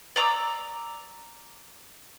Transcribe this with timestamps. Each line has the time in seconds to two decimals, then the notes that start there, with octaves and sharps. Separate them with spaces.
0.16 D5 A#5 D6 E6